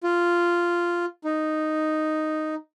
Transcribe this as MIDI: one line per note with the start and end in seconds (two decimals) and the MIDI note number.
0.03 1.05 65
1.24 2.55 63